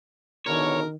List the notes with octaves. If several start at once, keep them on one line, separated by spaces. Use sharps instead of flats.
E2 B2 D3 D#3 A#4 C#5